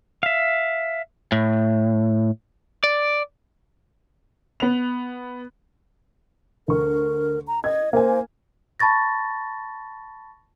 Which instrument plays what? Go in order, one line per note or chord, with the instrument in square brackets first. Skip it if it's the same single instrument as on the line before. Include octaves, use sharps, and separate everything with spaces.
[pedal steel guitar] E5 F5
[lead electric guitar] A2
D5
[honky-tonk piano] B3 F7
[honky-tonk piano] D2 C#6 [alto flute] A#4
[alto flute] A#5
[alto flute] D#5 [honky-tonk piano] G#6
[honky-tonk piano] A#3 G#5 [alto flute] C5
[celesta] A5 B5 C#6 A6 A#6